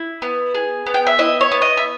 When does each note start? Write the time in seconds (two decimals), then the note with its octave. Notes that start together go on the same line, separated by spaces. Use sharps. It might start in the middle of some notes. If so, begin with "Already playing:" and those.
Already playing: E4
0.22 B3
0.54 G#4
0.86 B3
0.94 G5
1.07 E5
1.19 E4 D#5
1.41 C#5
1.52 B3
1.62 D#5
1.77 E5